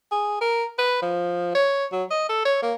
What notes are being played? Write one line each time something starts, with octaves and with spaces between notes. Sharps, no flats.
G#4
A#4
B4
F3
C#5
F#3
D#5
A4
C#5
A#3